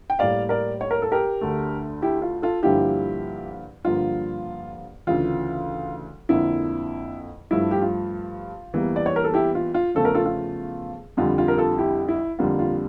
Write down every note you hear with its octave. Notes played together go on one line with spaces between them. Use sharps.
G5
A2 G3 A#3 D5 F5
A#4 D5
C#5
A#4
A4
G4 A#4
D2 D3 A3
E4 G4
F4
F4 A4
G2 D3 F3 A#3 E4 G4
G2 D3 F3 A#3 F4
D2 C#3 E3 F4
F2 D3 F3 A#3 E4
G2 F3 A3 E4
G4
F4
E2 E3 G3 A#3
D5
C#5
A#4
A4
E4 G4
F4
F4
E2 C#3 F3 A3 A4
A#4
F4 A4
F4
F2 D3 G3 F4
F4
A#4
F4 A4
E4 G4
E4
F2 D3 G3 A#3 F4
F4